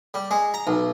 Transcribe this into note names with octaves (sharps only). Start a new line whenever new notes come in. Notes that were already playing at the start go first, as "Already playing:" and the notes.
G3
G#3
A#5
B1